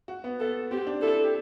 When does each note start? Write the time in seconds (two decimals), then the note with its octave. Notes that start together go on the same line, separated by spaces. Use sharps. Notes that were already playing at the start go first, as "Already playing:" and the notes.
0.08 F#4
0.24 B3
0.40 B3 A4
0.71 C4 G4
0.87 D4
1.02 E4 A4
1.24 G4